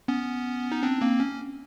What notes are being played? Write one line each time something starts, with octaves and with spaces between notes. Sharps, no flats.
B3 C#4
D#4
C4 D4
A#3 C4
C#4